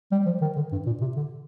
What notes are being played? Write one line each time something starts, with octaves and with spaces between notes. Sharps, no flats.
G3
F3
D#3
D3
G2
A#2
C3
D3